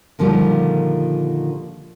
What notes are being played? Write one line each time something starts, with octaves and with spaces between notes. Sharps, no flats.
A#2 D3 D#3 F3 G3